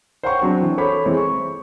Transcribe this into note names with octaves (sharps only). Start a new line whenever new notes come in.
C5 C#5 F#5 G5 C6 C#6
F#3 C4 D4
E3
A4 C5 C#5 B5 C#6 D6
E3 G#3 C4
C#6